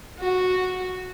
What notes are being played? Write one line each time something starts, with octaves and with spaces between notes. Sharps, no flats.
F#4